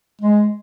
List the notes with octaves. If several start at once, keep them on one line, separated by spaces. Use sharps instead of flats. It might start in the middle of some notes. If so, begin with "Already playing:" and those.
G#3